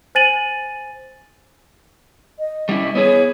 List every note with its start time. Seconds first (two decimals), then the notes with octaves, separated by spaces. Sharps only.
0.15 C5 G#5 A6 D#7 F#7
2.39 D#5
2.69 G3 C#4 E4
2.95 B3 E4 G#4 C#5